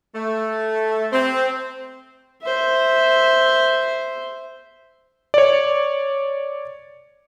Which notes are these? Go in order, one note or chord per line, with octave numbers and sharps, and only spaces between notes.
A3
C4
C5 E5
C#5 D5